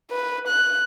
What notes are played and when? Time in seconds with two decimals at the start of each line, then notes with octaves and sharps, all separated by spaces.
0.11 B4
0.48 F#6